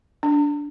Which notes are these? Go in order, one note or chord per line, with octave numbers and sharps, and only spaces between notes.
D4